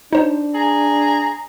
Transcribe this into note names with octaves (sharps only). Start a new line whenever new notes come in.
D4 D#4 C5
G#4 A#5